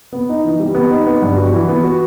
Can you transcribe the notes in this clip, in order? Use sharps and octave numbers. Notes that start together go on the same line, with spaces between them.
B3
D#4
E3
G3
B3
D#4
B3
G2
F#4
E3
B3
F#4